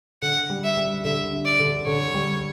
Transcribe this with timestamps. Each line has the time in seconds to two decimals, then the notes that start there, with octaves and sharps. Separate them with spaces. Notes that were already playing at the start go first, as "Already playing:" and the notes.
0.22 D3 F#5
0.50 G3
0.63 E5
0.77 G3
1.05 D3 E5
1.33 D4
1.45 D5
1.60 D3
1.87 D3 C#5
2.14 G3